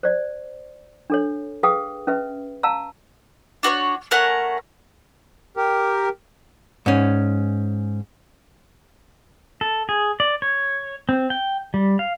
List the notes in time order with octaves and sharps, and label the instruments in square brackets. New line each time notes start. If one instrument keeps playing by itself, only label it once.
[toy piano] C5 D5
D4 A4 C#5
G#4 B4 F5 G5 D#6
C#4 B4 E5
F5 A5 A#5 E6
[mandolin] D4 F#4 A#4 C#5
A3 C#4 A#4 F#5
[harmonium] G4 A#4
[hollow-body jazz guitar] G#2 C#4
[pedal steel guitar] A4
G#4
D5
C#5
C4
G5
G3
F5